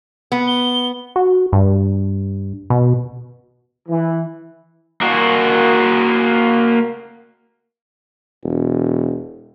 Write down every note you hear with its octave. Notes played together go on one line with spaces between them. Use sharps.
B3
G7
F#4
G2
B2
E3
A#3 F#4
E1